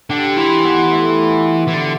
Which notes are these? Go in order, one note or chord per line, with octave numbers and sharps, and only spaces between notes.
D3 G4
E3 F4
B3
A3
E3
D3